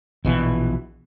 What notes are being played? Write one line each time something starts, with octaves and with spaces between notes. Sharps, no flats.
A#1 B2 E3